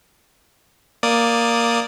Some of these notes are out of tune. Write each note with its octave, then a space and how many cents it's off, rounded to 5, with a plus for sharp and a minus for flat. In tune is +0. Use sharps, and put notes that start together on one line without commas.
A#3 +0 D5 +0 D#6 +0